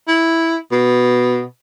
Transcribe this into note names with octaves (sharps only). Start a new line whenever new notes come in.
E4
B2